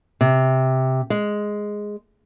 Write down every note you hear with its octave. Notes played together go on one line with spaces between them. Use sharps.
C3
G#3